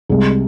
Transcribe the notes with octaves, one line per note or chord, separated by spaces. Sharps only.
C2 C3 G#3